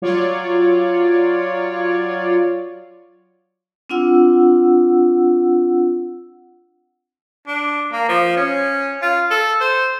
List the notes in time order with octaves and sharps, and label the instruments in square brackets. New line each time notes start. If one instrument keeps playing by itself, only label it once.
[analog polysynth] F#3 F4 C#5 D5
[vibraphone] C4 D4 F4 F#5 E6
[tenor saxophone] D4
A#3
F3
C#4
F4
A4
C5